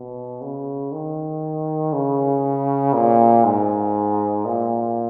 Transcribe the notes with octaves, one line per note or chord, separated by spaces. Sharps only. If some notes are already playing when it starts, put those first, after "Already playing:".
Already playing: B2
C#3
D#3
C#3
A#2
G#2
A#2